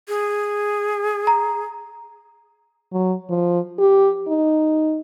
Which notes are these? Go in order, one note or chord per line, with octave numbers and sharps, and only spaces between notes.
G#4
A#5
F#3
F3
G4
D#4